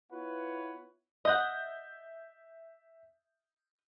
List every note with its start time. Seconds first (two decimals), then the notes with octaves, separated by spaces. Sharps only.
0.12 B3 E4 F4 B4 C#5 F#5
1.25 D#5 E5 F#5 G6